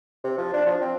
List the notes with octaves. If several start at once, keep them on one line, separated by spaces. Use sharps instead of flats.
C3
F3
D4
F3
C4